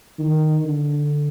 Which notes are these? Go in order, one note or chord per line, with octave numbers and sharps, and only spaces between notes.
D#3
D3